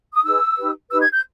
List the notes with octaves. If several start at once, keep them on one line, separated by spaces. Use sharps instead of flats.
D#6
D#4 G#4 B4 E6
D#4 G4 B4
D#4 G4 B4 E6
G#6
G6